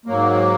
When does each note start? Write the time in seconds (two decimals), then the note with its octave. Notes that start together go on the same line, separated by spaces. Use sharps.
0.06 G#2 F#3 A#3